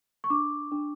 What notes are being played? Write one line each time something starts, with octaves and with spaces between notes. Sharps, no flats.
C#6
D4 D6
D4